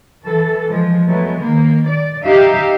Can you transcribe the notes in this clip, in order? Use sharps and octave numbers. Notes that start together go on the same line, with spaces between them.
E3 A4
F3 G#3
F#3 G#3 A3 B3
D#3 A#3
D5
D#4 G4 E5 F5